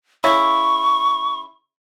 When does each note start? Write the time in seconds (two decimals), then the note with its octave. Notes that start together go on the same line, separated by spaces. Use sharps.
0.24 C#3 E4 C#6